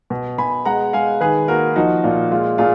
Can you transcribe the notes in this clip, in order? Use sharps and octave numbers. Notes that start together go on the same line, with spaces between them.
B2
B2 G#5 B5
G#3 F#5 A#5
G#3 F5 G#5
D#3 G#4 B4
A#3 F#4 A#4
F3 D#4 F#4
A#2 F4
G#3 F4
A#2 F4 G#4